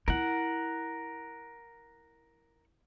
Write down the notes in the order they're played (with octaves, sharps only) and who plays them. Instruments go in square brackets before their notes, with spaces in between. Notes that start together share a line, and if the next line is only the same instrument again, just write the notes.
[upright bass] E4 [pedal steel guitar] A#4 F#5